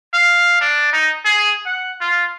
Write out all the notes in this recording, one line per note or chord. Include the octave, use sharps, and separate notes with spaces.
F5
D4
D#4
G#4
F#5
F4